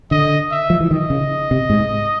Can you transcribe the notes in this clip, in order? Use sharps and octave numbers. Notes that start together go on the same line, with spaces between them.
D3 D#5
E5
F3
E3
D#3 D#5
C#3
C3
G#2